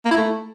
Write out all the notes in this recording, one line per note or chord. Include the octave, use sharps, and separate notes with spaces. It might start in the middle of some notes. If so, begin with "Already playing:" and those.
A#3
E4
A3